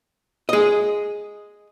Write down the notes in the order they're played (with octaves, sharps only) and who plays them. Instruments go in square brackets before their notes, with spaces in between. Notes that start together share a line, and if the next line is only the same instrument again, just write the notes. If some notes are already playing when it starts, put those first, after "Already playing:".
[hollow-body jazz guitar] G#4 D#5